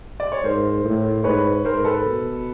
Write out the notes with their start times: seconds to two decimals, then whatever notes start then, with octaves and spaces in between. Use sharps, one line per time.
0.20 D5
0.32 C#5
0.44 G#2 A#4 C5
0.85 A2
1.24 G#2 B4 C#5
1.65 G#2 A#4 C5
1.84 A4 B4
2.05 B2